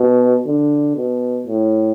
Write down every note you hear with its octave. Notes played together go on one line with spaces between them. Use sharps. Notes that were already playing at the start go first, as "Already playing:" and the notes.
Already playing: B2
D3
B2
A2